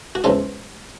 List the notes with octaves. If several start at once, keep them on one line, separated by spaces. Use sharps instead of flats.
F#4
E2 C#3 F3 G#3 F4